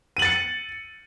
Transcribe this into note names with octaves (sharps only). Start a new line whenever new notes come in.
A6 C#7 D#7 F#7